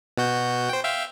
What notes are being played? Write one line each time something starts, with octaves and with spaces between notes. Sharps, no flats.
B2 F#4 G6
C5 G5
E5 F5 G5